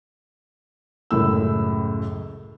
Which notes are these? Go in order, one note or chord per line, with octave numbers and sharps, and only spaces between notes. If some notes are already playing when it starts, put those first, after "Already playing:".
C#2 F#2 A2 E6